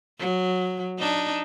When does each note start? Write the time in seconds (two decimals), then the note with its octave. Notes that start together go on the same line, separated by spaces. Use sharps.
0.19 F#3
0.99 D4 D#4